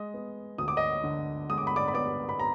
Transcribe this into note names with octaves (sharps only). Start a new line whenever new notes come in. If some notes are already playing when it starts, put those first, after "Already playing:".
Already playing: G#3 D#5
B3
D2 D#6
D6
D#5 D#6
D3
G#3 D#6
D6
B5
D5 D6
B5
B3 D5 D6
B5
A#5